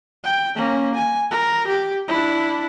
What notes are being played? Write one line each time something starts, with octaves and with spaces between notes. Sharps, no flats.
G5
A#3 C#4
G#5
A#4
G4
D4 E4